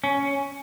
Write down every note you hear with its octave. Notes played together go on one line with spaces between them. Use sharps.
C#4